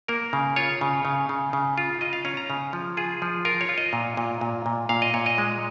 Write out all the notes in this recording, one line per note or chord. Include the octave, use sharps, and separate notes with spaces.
A#3 A#4
C#3
F4 C#5
C#3
C#3
C#3
C#3
F4
F4 D#5
F5
C#4 A#5
A#5
C#3
F3
F4 G#4
F3
F4 A#4
C#5
F4
D#5
A#2
A#2
A#2
A#2
A#2 F5
D#5
A#2 C#5
D#5
G#3